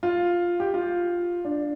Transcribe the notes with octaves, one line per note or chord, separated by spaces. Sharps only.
F4
G4
F4
D4